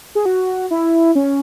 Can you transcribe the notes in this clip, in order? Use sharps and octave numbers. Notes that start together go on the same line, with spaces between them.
G#4
F#4
E4
C#4